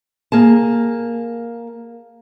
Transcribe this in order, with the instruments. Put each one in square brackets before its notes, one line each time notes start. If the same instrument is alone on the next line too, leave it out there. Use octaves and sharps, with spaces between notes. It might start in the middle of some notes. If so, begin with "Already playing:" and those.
[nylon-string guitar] A#3 G#4 A5